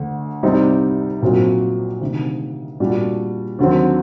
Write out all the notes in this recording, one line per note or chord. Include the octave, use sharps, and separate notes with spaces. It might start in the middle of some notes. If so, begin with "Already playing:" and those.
Already playing: D2 D3 A3
C2 C3 G3 C4 D#4
A#1 A#2 F#3 C4 F#4
D2 C3 D#3
A#2 G3 D4 F#4
D#2 D3 F#3 C4